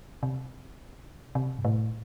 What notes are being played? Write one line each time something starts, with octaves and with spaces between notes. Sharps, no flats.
C3
C3
G2
A2